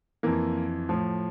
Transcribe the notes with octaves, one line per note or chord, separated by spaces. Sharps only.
F2 E3 A#3
A2 F3